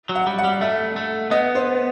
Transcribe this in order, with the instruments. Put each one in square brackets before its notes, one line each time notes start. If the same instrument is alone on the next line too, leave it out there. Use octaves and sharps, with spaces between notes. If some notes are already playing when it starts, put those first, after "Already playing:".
[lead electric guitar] F#3
[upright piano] F#5
[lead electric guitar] G3
[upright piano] F#5
[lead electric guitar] G3
[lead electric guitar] A3 [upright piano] E5
[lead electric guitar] A3
[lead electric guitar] B3 [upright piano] D#5
[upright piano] C5